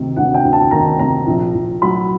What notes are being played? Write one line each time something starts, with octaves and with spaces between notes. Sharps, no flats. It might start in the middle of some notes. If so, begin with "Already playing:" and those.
Already playing: D2 C3 D#3
D2 F#5
G5
D2
A5
D#3 A#5
C3 A#5
A#1
A#1
F#3 B5